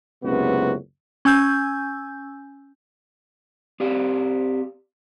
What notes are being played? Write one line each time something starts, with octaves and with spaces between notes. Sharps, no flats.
F#1 C#2 C3 B3 F#4
C#4 G#5 E6 G6
C4 G4 D5 F5